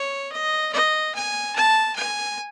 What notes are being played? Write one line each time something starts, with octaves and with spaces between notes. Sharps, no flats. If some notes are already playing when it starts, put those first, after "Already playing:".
Already playing: C#5
D#5
D#5
G#5
A5
G#5